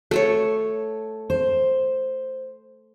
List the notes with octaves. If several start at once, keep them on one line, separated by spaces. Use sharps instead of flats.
A3 A4 C#5
C5